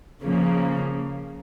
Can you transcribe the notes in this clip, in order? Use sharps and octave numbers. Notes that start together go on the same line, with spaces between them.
C#3 F3 A#3